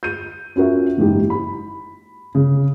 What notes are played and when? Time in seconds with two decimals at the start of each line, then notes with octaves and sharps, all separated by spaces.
0.03 G6 D#7
0.56 C#4 F4 F#4 A#4 E5
0.97 F#1 G#2 E3 G4
1.30 B5
2.35 C#3